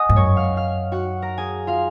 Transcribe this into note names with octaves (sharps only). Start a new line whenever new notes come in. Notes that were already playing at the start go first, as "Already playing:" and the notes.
Already playing: D#5 F#5 G#5 D#6 F#6
G#2
F#2 C#5 C#6
F5 F6
F5 F6
F#4 F#5
A#4 A#5
G#4 G#5
F4 F5